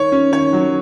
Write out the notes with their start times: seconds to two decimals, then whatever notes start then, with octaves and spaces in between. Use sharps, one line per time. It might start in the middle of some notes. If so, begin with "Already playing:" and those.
Already playing: D#3 C#5
0.12 C#4
0.32 D#3 C#5
0.53 F#3